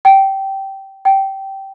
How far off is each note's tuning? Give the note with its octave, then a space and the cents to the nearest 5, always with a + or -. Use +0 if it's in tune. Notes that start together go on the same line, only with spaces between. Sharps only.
G5 -15
G5 -15